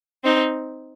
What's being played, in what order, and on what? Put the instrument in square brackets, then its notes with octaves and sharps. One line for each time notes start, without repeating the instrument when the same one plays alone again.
[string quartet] C4 D#4